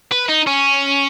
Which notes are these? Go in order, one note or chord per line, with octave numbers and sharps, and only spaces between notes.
B4
D#4
C#4